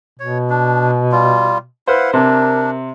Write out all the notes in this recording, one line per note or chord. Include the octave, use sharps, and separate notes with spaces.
B2 C#5
D4
G3 F4
E4 B4 C5 F5 F#5
C3 D4 A#4